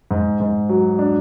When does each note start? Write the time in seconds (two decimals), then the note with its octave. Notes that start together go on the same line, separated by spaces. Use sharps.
0.11 G#2
0.40 G#2
0.69 F#3
0.99 D4